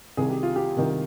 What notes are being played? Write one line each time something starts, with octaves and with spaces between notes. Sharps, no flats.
C2 C3 D#3 G#4
G4
F4
G4
C2 C3 D#3